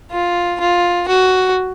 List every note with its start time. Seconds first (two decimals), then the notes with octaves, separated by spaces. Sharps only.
0.11 F4
0.60 F4
1.08 F#4